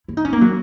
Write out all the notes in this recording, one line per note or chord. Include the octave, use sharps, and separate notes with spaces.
E4
D#4
C#4
A#3
F#3